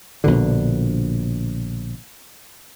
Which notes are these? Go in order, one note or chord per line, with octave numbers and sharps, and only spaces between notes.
A#1 B2 D3